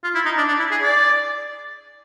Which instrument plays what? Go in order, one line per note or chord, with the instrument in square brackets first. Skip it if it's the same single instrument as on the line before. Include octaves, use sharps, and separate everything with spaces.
[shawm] F4
E4
D#4
D4
D4
E4
G#4
D5